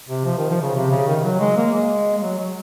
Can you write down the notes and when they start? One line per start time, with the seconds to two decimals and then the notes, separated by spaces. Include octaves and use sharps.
0.09 C3
0.25 F3
0.38 D#3
0.50 F3
0.62 C#3
0.75 C3
0.91 C#3
1.07 D#3
1.24 F#3
1.40 G#3
1.57 A#3
1.74 G#3
2.17 G#3
2.22 F#3
2.38 F#3